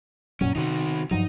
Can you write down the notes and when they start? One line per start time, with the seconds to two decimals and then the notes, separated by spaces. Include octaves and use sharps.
0.41 F#2 A#2 F#3 C#4
0.56 C3 D#3 D#4 F#4
1.11 G2 F3 F#3 D#4